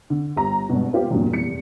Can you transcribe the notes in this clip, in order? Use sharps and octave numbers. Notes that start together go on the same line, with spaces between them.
D3
G1 G4 A#5
G#1 G2 B2
B3 F4 G4 C5
E2 G2 A#2 F#3 D4
F1 E2 C#7